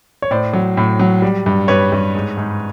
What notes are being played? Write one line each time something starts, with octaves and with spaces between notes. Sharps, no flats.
C#5
A2 C5 D5
F#3
A2
F#3
G3
G2
G2 B4 C#5
G2
G#2
G#2